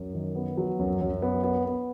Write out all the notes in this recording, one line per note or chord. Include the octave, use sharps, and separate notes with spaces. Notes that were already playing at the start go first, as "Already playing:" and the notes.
Already playing: F#2
D#3
B3
F#3
F#2
F#2
B3
B3
B3